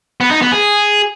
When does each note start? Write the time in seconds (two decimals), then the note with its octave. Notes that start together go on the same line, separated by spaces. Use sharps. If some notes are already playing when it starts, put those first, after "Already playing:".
0.21 B3
0.31 D#4
0.42 B3
0.52 G#4